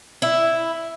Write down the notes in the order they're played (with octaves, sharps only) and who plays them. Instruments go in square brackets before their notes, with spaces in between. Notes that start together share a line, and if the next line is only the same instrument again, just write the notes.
[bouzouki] E4